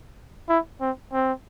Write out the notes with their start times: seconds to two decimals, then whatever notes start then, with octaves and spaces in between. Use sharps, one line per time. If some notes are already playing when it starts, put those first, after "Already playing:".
0.49 E4
0.81 C4
1.13 C4